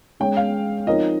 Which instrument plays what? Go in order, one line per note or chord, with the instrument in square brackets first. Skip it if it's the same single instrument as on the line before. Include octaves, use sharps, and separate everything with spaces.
[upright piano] G#3 C#4 G#4 C#5 [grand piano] G5
[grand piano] F5
[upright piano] F3 C4 D#4 A#4 C#5 [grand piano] D#5